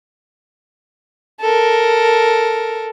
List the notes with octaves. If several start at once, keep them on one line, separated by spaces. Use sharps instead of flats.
A4 A#4